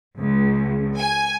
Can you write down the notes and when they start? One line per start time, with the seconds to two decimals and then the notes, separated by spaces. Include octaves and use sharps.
0.17 C#2
0.97 G#5